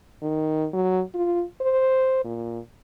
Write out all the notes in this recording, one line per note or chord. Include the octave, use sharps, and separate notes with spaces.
D#3
F#3
F4
C5
A#2